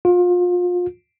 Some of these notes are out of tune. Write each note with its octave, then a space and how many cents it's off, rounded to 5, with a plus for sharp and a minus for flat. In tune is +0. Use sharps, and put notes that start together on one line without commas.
F4 +30